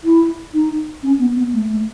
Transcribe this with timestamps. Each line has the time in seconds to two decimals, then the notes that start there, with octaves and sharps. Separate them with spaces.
0.04 E4
0.54 D#4
1.03 C#4
1.19 B3
1.36 B3
1.53 A3
1.70 A3